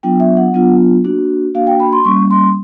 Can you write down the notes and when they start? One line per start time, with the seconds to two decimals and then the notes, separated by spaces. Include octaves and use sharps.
0.03 F#3 B3 D4 F4 G5
0.20 E5
0.37 F#5
0.54 F#3 B3 D4 F4
1.04 A#3 D4 F#4
1.55 A#3 D4 F#4 F5
1.67 G5
1.80 B5
1.93 C6
2.05 G3 A#3 C#4 C#6
2.31 C6